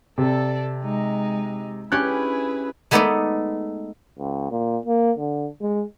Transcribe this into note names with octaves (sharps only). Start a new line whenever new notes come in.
C3 A4 D5
G#3 D#4
C#4 D4 E4 G4 G#4 B4 F#6
G#3 A3 B3 D#4 A4 D5
C#2
A#2
A#3
D3
G#3